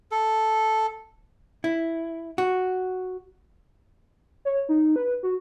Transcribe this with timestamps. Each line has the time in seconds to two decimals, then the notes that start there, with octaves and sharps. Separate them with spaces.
0.12 A4
1.64 E4
2.38 F#4
4.45 C#5
4.69 D#4
4.96 B4
5.23 F#4